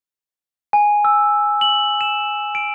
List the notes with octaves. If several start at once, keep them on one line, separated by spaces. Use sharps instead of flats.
G#5
E6
F#7
E7
D7